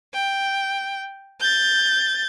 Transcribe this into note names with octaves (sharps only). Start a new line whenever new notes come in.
G5
G6 A6